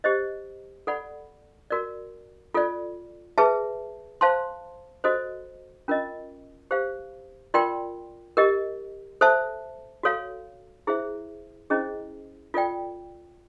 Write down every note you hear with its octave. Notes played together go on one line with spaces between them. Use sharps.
G4 C5 D#5
A4 D5 F#5 B5
F#4 A#4 D5
F4 A4 D5
G#4 B4 E5 A5
C5 F5 A5 C6
F#4 A4 C5 D#5
C#4 F4 A#4 D#5
G4 C5 F5
F4 A#4 D5 G5 C6
G4 A#4 D#5
A4 C5 E5 A5
F#4 A4 C#5 F5
E4 G#4 C5 E5
C#4 E4 G#4 C5 D#5
F4 A4 D5 G5